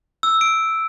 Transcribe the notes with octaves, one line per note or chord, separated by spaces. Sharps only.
E6
D7